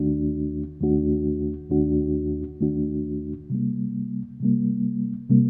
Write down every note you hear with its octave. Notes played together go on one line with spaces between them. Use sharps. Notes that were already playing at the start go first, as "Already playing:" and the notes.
Already playing: D#2 D#3 A3 D4 F#4
D#2 D#3 A3 D4 F#4
D#2 D#3 A3 D4 F#4
D#2 D#3 A3 D4 F#4
C3 G3 A#3
C3 G3 A#3
C3 G3 A#3